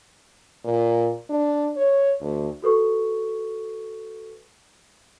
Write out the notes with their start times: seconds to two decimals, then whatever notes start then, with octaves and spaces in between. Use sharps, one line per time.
0.65 A#2
1.30 D4
1.76 C#5
2.21 D2
2.62 F#4 A4 B4 C#6